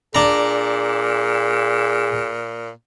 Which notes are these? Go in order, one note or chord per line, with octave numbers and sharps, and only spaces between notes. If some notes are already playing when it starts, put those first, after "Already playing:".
A#2 D4 G#4 A#5